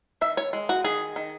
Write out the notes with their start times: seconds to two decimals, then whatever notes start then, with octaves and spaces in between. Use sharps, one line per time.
0.21 D#3 E5
0.37 C#5
0.53 G#3
0.69 F#4
0.84 D#3 G#4
1.16 D#3